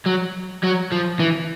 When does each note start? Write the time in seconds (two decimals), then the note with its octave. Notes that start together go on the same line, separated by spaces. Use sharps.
0.06 F#3
0.64 F#3
0.92 F3
1.20 E3